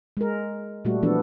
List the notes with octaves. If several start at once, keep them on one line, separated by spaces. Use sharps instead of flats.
G#3 A#4
A#2 G3 A3 F#4
E3 F3 B3 D4 A4